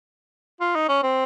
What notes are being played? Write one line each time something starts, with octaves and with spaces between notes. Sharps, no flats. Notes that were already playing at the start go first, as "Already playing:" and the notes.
F4
D#4
C#4
C4